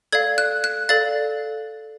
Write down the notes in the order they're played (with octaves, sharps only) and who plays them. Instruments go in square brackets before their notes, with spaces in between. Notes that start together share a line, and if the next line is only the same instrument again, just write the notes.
[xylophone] A4 D5 F5 G#6
F#6
F#6
A4 D5 F5 A6